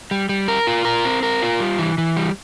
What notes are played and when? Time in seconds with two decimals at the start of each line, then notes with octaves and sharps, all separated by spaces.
0.11 G3
0.29 G3
0.48 A#4
0.67 F4
0.85 A#4
1.05 C4
1.23 A#4
1.42 F4
1.60 G3
1.79 E3
1.98 E3
2.17 G3